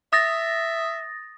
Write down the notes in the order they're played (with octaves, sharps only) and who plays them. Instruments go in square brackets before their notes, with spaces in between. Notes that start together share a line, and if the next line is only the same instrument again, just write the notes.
[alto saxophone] E5 [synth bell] D#6 A6 A#6